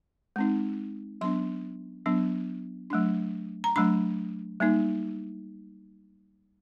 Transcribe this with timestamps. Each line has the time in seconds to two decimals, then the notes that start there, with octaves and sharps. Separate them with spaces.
0.36 G#3 C4 D#4
1.21 F#3 B3 D4 C6
2.06 F#3 B3 D4
2.90 F#3 A3 D4
3.64 A#5
3.76 F#3 A3 D4 B5
4.60 G3 A#3 D#4